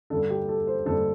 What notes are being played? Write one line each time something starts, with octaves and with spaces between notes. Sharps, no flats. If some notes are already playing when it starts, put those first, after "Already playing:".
G2 D3 A4
G4
A4
C5
G2 D3 A4